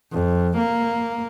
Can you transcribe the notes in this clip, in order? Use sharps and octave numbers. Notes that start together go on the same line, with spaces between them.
F2
A#3